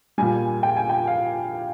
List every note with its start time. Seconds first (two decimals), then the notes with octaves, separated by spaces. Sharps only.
0.18 A#2 G3 G#5
0.63 G5
0.77 G#5
0.89 G5
1.07 F5